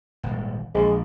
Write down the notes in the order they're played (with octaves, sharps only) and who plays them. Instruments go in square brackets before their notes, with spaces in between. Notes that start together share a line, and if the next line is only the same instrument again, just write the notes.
[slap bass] D#1 G#1
[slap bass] A#1 [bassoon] G#3